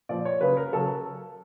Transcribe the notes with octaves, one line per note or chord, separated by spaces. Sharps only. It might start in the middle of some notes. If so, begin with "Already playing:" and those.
A#2 F3 D5
C#5
C#3 F#3 B4
A#4
C#3 F#3 A4